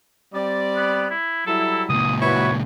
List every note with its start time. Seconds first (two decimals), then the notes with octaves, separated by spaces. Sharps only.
0.34 G3 C4 D5
0.77 B3
1.11 E4
1.47 F#3 G3 E4 A4
1.90 C#2 A#2 D#6
2.22 E4 F#4 B4 C#5